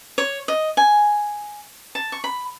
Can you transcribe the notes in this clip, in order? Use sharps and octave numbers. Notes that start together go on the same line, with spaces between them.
C#5
D#5
G#5
A5
C#6
B5